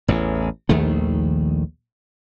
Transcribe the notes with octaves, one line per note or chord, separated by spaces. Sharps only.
A1 E2
A#1 D#2 D#3 A3